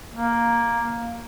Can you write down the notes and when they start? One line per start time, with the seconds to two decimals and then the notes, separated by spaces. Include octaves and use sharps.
0.13 A#3